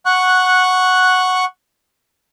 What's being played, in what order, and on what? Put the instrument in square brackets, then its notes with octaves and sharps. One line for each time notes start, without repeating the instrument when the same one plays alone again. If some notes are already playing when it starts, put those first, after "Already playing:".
[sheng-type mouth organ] F#5 C#6 F#6